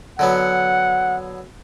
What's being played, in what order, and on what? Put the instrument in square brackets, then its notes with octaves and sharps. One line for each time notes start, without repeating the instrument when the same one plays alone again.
[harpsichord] D3 F#3 B3 [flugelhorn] F#5